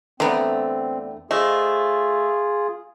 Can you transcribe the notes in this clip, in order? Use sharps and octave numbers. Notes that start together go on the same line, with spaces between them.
E2 D3 A3 B3 C4 A#5
A3 F4 G#4 C5 D#5